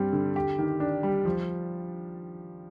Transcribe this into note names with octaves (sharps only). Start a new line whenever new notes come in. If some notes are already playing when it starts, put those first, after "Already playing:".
Already playing: G2 G3 C4
D3
G4
D#3
D4
G3
F3